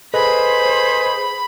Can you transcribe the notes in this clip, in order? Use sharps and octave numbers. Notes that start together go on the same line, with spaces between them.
G#4 A4 B4 C5 D#5 B5